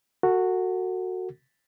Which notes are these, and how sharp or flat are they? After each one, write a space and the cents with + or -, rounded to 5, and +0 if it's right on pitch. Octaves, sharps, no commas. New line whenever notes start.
F#4 -5 A4 +35